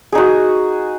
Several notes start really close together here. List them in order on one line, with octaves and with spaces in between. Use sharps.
G#4 D#4 F#4